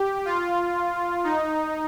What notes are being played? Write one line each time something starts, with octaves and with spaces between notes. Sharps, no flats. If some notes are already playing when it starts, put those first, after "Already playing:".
Already playing: G4
F4
D#4